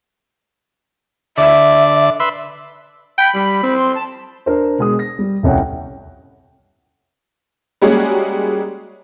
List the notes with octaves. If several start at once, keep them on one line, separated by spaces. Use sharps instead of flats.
D3 D5 E5
B4 E5 C6
G5 B5
G3
C4
C6
A5
D4 A#4 C5
B2 G#3 D#6
A#6
G3
F1 C2 C#4 F#5 G5
G3 G#3 A#3 C#4 F#4 G#4